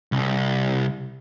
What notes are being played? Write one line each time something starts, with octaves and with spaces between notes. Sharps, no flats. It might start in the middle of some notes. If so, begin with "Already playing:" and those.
C2